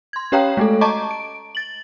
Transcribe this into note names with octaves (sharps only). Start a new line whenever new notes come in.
C6 G#6
C#4 G4 C#5 F5 G5 A#5
G#3 A3 A4
D#5 A5 A#5 C#6 D6
D7
A6 F#7